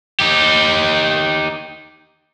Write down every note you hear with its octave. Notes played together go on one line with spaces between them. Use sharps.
D#4 G4